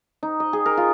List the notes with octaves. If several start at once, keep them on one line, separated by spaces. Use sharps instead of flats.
D#4
D#5
G#4
A#4
F4